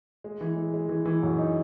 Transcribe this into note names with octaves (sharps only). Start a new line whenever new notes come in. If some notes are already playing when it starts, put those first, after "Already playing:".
G#3
E3
G#3
G#3
E3
E3
F#2
D#4